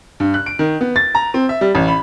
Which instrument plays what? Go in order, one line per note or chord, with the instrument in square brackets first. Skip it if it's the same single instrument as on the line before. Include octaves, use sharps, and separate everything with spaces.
[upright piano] G2
F#6
D7
D#3
B3
A6
A#5
C4
E5
G3
A1
B5